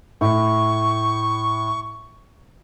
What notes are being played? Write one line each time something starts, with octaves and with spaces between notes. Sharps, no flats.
A2 C#6